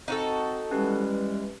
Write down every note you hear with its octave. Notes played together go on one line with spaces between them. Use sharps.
C4 D#4 F#4 A4
E3 G3 G#3 C#4 G4 B4